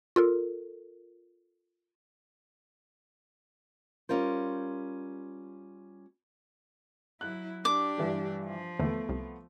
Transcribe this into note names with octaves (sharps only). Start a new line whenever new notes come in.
F4 A4 A#4
G3 C#4 F4 A#4 C5
F#3 E4 F#6
D4 G4 D6
G2 E3 G3
F3
D#2 D3 E3 A3 B3
C2